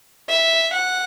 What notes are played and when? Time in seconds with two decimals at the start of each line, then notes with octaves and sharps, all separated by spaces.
0.29 E5
0.73 F#5